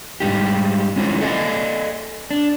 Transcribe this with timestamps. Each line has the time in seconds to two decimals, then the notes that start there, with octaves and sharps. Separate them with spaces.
0.20 G#2 G3 D#4 G4
0.96 G#3 C#4 E4 F4 C5
1.21 A4 D5 D#5 F5 G#5
2.31 D4